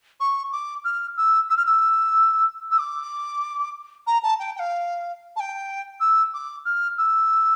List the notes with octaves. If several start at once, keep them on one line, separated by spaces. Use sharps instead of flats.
C#6
D6
F6
E6
E6
F6
E6
E6
D6
A#5
A5
G5
G5
F5
A5
G5
E6
D6
F6
E6